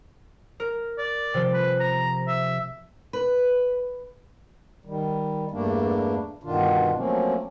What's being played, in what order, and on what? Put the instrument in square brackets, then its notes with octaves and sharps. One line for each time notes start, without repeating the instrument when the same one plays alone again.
[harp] A#4
[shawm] D5
[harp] C3 F3 G4
[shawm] B4
A#5
E5
[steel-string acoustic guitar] B4
[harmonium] D#3 G3
E2 G2 G3 A3 A#3 D4
G2 B2 D3 D#3 D4 F4
F3 F#3 A3 A#3 C4 C#4